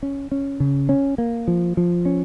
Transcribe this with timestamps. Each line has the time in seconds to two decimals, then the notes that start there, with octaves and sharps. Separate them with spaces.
0.03 C#4
0.32 C#4
0.60 C#3
0.89 C#4
1.18 A#3
1.48 F3
1.77 F3
2.06 C#4